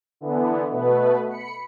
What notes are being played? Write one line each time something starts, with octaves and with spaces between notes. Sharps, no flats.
D3 E3 B3
B2 A3 B3 B4
B5 C#7